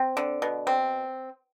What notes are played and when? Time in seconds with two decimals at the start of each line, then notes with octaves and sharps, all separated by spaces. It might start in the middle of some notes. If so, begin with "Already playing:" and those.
Already playing: C4
0.17 D3
0.42 B2
0.67 C4